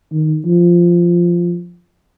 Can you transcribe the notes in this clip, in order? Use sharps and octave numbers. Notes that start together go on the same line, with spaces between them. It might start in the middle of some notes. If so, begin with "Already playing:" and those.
D#3
F3